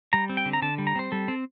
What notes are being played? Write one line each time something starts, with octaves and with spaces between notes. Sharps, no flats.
G3 A#5
C4
G5
D3
A#5
D3 A5
G3
A#5
C4 C5
G3 A4
C4